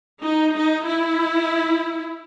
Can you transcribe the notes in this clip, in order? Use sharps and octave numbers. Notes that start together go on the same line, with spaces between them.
D#4
D#4
E4